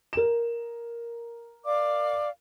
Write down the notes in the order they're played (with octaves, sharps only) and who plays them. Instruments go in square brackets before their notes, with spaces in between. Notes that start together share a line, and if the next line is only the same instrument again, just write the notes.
[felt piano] A#4 E7
[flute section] D5 F5 D6